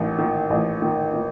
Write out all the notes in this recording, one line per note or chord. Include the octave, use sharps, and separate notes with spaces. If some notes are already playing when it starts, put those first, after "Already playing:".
Already playing: A1 D#3
D#3
A1
D#3
D#3